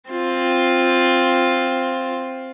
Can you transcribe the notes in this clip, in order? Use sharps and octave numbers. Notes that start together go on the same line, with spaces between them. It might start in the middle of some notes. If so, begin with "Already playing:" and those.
C4 F4